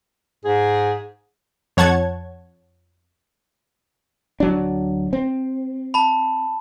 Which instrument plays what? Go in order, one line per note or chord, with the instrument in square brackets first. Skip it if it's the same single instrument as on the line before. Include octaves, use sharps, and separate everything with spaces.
[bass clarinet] G#2 [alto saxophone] G#4
[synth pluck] F2 C#5 F#5 A5 G#6
[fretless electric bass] D1 F#3 D4
C4
[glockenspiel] A5 B5